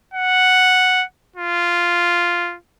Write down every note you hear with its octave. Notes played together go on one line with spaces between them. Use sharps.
F#5
F4